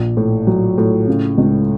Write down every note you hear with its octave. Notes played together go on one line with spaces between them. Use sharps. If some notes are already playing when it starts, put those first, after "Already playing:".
Already playing: A#1
A2
F#3
A2
C#3
C#2